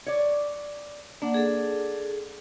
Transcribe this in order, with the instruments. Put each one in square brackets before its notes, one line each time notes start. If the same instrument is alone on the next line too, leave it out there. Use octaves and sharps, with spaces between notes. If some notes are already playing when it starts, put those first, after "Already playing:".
[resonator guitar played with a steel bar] C#5 D5
[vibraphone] A#3 F#5 [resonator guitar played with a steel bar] D4
[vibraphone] G#4 A4